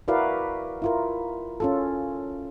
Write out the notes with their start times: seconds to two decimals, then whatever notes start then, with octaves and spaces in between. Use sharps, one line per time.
0.08 E4 F#4 A#4 B4 D5 F5
0.82 E4 F4 A#4
1.60 C#4 F4 A4